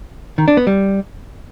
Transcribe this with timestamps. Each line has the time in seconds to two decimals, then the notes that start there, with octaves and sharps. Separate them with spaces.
0.38 D#3
0.48 D4
0.57 B3
0.67 G3